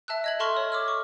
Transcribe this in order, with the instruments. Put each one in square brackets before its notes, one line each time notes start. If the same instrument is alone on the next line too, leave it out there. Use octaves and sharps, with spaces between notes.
[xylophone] E5 A5 E6 F#6
D#5 G#6 F#7
A4 E5 A5 C6 C#6 F6
C#5
D6 E6 F6
C#6